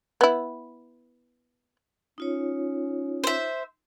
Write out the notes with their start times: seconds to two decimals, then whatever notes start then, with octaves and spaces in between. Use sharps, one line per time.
0.21 B3 E4
2.18 C#4 D#4 F4 C#5
3.24 C5 E5